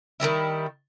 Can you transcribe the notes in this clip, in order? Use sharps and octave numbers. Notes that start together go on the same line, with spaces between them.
D#3 E3 G3 E4